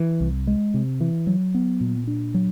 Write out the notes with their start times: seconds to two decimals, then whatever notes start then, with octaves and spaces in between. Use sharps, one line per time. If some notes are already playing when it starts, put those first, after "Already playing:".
Already playing: E3
0.20 C2
0.47 G#3
0.74 C3
1.01 E3
1.27 F#3
1.55 B3
1.81 A#2
2.07 D4
2.35 F#3